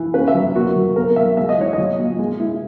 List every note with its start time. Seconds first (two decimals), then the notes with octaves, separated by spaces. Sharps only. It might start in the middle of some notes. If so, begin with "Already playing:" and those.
Already playing: E3
0.14 C#4 B4
0.28 E5
0.35 F#3
0.55 A#3 F#4
0.76 F#3
0.96 B3 A#4
1.16 F#3 E5
1.37 G#3 E5
1.49 D#5
1.57 E3 C#5
1.73 F#3 D#5
1.98 A#2
2.19 G#3
2.40 E4